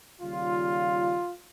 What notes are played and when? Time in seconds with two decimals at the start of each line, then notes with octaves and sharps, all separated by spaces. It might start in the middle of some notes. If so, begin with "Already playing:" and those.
0.21 D#2 C#3 G3 F4